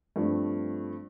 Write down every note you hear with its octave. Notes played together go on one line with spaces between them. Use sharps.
G2 F3 A3 C4